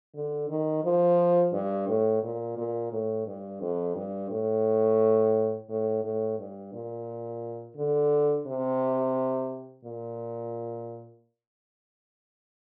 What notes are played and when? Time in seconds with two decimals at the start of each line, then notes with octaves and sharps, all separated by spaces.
0.15 D3
0.49 D#3
0.84 F3
1.53 G2
1.88 A2
2.23 A#2
2.57 A#2
2.92 A2
3.26 G2
3.61 F2
3.95 G2
4.31 A2
5.69 A2
6.04 A2
6.39 G2
6.73 A#2
7.77 D3
8.47 C3
9.85 A#2